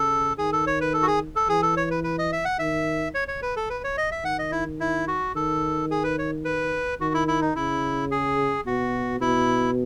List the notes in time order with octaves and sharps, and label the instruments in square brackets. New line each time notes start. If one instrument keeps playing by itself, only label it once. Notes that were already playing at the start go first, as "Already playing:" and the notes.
Already playing: [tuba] C#3 [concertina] A4
[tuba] D#3 [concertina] G#4
[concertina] A4
C#5
B4
A4
F#4
G#4
A4
[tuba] E3 [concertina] G#4
[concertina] A4
C#5
B4
B4
D#5
E5
F#5
[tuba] D#3 [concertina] E5
[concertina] C#5
C#5
B4
A4
B4
C#5
D#5
E5
[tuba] D#3 [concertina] F#5
[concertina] D#5
E4
E4
F#4
[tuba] D#3 [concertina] A4
[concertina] G#4
B4
C#5
B4
[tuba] D#3 [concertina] F#4
[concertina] E4
E4
D#4
[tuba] C#3 [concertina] E4
[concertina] G#4
[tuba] B2 [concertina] F#4
[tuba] B2 [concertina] E4